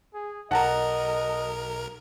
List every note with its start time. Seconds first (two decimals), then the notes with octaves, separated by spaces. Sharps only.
0.14 G#4
0.51 B1 A#4 D#5 F#5 A5 A#5